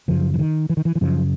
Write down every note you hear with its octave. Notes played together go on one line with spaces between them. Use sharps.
F#2 C#3 F3
E3
D#3
E3
D#3
E3
E3
F#2 C#3 F3